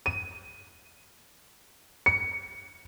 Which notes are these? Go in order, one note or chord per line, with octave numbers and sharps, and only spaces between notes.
D#7
C#7